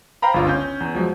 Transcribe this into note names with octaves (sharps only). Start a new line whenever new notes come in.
C5 F5 G5 A#5 B5
G1 C#2 D4 F4
C#4 G6
E2
F3 F#3 G#3